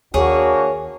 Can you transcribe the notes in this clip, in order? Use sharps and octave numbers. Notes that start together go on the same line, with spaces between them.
D#2 A#3 D4 F#4 G#4 C#5